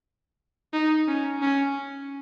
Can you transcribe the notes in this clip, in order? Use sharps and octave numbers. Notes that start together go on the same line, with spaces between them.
D#4
C#4
C#4